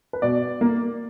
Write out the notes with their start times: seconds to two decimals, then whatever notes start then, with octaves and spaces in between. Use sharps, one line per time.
0.13 B4
0.22 B2 D5
0.61 A#3